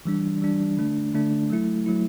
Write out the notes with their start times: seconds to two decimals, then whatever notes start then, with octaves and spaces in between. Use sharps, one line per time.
0.05 E3 G3 D4
0.41 E3 G3 D4
0.77 D3 A3 D4
1.14 D3 A3 D4
1.50 F#3 A3 E4
1.86 F#3 A3 E4